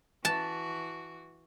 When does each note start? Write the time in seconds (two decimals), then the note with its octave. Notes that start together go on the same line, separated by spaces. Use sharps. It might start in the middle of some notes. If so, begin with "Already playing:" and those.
0.25 E3 F#4 A5